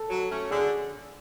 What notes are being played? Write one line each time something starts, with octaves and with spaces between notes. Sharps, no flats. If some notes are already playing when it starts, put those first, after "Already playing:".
Already playing: A4
F#3
A3 C#4
D3 G#4